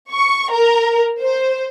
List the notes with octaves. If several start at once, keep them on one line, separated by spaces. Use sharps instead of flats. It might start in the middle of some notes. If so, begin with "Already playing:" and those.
C#6
A#4
C5